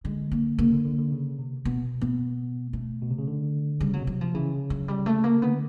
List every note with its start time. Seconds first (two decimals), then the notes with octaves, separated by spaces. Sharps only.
0.04 D3 G#3
0.31 A#3
0.59 C#3 A#3
0.72 D3
0.85 D3
0.98 D3
1.12 C#3
1.39 C3
1.65 B2 B3
2.01 B3
2.73 A3
3.02 B2
3.11 C3
3.19 C#3
3.27 D3
3.80 C#3 G3
3.94 F#3
4.01 B2
4.07 C3 F#3
4.21 F3
4.34 C#3 E3
4.70 F#3
4.88 G3
5.06 A3
5.24 A#3
5.42 D3 B3